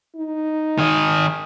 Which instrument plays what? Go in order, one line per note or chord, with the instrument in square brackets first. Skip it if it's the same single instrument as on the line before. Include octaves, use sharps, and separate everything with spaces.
[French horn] D#4
[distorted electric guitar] D#3 G#4